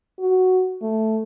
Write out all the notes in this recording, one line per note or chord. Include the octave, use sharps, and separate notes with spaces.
F#4
A3